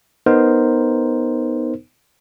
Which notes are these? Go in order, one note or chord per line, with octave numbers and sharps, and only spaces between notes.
B3 D#4 A#4 C5